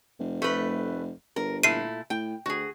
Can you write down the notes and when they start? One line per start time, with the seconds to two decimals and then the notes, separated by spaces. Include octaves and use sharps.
0.19 F1
0.42 A3 B4
1.36 G1 A#4
1.63 A#2 A3 E4 C7 D#7
2.10 A2 G5
2.46 D2 F#4 G#4